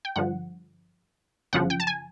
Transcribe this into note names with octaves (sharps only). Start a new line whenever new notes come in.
G5
G2 D3 F3 F#5
G1 F#2 C#3 F3 F#5
G5
A5
G#5